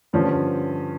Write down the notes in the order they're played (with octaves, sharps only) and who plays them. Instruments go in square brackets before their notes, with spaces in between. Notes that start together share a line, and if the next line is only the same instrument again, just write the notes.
[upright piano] G2 D3 F3 C#4